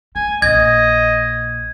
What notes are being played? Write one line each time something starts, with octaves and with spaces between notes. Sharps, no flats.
A3 G#5
A#1 A#3 D#5 G#6